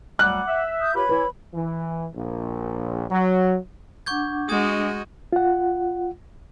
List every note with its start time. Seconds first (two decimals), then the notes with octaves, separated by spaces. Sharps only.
0.19 D2 F#3 G3 F#5 D6 F#6
0.48 E5
0.81 D#6 G6
0.95 F4 G4 B4 C#5 B5
1.09 E3 E4 B4
1.55 E3
2.15 A#1
3.11 F#3
4.06 D4 F#5 C#6 D6 G6 G#6
4.49 G#3 F#4 D#5 D#6 G#6
5.33 F4 F#5